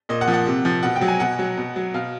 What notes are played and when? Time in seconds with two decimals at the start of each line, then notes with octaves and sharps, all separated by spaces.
0.09 A#2 D#5
0.21 F#5
0.28 F3
0.33 F#5
0.47 C3
0.65 F3
0.83 B2 F#5
0.96 G5
1.01 F#3
1.08 G#5
1.20 B2 F#5
1.39 F#3
1.57 B2
1.76 F#3
1.94 B2 F5